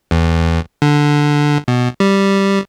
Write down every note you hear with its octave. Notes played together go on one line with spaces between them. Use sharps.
E2
D3
B2
G3